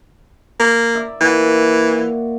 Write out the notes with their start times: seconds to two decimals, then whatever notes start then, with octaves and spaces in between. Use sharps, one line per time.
0.60 A#3
0.95 D5 E5
1.21 A#2 E3 F#4